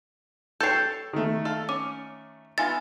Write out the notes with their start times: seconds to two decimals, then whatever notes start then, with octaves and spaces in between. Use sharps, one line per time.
0.60 A4 C#5 G5 A5 G6 C7
1.13 D#3 A3
1.45 A4 F5
1.69 C#4 D6
2.58 B3 F4 E5 G#5 A6